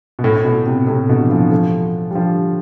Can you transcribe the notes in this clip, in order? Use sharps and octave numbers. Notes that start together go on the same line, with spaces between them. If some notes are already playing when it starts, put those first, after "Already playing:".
B2
A2
A2
B2
A2 C3
A2 C3
B2 D3
E3
D3 F3
F3 A3
G3
D3 F3